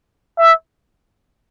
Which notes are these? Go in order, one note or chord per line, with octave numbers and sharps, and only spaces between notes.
E5